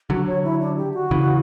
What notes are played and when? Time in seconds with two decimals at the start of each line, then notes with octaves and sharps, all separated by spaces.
0.10 D3 F#3 F#4
0.27 C#5
0.44 E4
0.61 D4
0.77 G4
0.94 F#4
1.11 C#3 E3